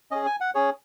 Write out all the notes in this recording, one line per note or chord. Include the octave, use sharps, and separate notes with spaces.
C#4 G#4 D#5
G#5
F#5
C#4 G#4 C#5